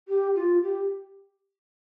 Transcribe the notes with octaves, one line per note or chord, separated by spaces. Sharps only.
G4
F4
G4